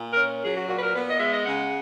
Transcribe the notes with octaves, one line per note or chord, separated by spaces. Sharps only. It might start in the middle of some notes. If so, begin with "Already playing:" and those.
Already playing: A#2
A#4
C#4
F#3 G#4
F#4
A#2 F#4
B4
A#4
B3 B4
D#5
G#3 E5
D#5
C#3 F#5